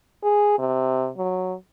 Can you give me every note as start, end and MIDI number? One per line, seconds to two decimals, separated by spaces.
0.23 0.57 68
0.58 1.09 48
1.17 1.54 54